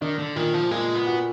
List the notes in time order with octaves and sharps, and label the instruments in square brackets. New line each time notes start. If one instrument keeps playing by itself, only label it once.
[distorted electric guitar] D#3 [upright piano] D4
[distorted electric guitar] D3
[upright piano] A#2 [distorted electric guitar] D#3
[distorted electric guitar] F3
[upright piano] A#2 [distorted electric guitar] G#3
[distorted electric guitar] B3
[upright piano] F#4